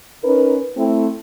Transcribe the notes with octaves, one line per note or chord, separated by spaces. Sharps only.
C#4 D#4 A#4 B4
A3 C4 E4